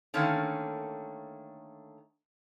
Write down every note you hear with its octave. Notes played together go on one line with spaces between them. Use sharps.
D3 D#3 A3 A#3 C#4